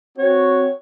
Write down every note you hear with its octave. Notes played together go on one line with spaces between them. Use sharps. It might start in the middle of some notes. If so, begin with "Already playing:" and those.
C4 F#4 C#5